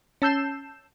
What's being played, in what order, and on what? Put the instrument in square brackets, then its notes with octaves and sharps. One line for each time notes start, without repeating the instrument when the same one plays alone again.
[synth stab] C#4 A5 E6 G6 C7 E7